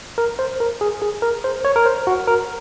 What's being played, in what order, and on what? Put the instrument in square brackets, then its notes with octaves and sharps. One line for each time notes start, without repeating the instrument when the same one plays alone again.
[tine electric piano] A#4
C5
A#4
G#4
G#4
A#4
C5
C#5
A#4
C5
F#4
A#4